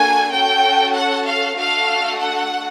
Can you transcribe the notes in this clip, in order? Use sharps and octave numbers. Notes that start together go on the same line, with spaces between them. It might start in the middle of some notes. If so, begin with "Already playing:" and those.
Already playing: A#3 D4 F#4 A4 G#5
C#4 F#4 A4 G5
F#5
F5
A3 D4 F#4 A4 F5
F#5